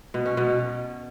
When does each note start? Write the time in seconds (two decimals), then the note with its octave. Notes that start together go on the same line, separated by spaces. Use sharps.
0.14 B2
0.26 C#4
0.37 B2